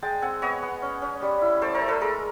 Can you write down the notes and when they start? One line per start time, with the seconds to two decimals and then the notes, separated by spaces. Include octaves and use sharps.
0.02 G#3 G5 A5
0.22 C4 F#5 G#5
0.42 B3 C#5 D#5
0.62 B3
0.82 C#4
1.02 C#4
1.22 G3
1.42 E4
1.61 A3 C5 D5
1.74 A#4 C5
1.81 A3
1.88 A4 B4
2.01 G#3 G#4 A#4